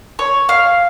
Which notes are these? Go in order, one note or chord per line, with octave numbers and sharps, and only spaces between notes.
C#5
F5